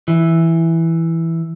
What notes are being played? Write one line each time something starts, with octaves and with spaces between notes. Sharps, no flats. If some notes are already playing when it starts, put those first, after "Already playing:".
E3